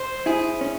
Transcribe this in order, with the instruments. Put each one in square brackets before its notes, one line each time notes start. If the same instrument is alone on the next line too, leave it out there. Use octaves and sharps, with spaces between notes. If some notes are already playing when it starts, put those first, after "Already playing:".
Already playing: [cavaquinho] C5
[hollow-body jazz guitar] E4 [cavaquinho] G#4
[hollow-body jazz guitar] C#4